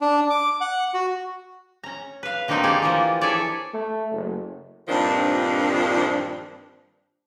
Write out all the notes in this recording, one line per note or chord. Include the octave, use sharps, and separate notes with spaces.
D4
D6
F#5
F#4
C#4 A#5
B4 F5
D3 D#3 A#3 C4 D#4
G4 G#4 C#5 D5 F5
E3 F3 A#3
E4 G#4 A4 C#5 D5
A3
F#1
G2 A#2 D#3 F3 C4 D4